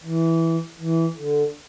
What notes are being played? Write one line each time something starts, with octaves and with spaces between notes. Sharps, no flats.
E3
E3
D3